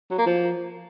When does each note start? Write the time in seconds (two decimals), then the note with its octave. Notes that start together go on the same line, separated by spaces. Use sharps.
0.10 F#3
0.19 A#3
0.27 F3